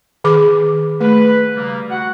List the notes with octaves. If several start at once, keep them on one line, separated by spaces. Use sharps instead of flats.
D#3 G#4 D6
A3 B4
C#3 G3 A#3
F#4 F#5